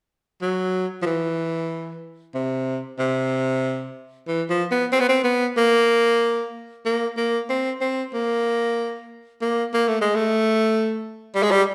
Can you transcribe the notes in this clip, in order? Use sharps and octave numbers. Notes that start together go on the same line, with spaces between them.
F#3
F3
E3
C3
C3
E3
F3
B3
C4
B3
C4
B3
A#3
A#3
A#3
C4
C4
A#3
A#3
A#3
A3
G#3
A3
G3
G#3
G3